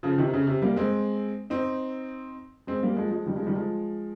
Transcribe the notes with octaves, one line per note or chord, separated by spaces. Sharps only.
C#3 F3
C3 D#3
C#3
C3
G3 A#3
G#3 C4
C4 D#4
G#3 C4
G3 A#3
F3 G#3
F3 G#3
D#3 G3
F3 G#3
D#3 G3
F3 G#3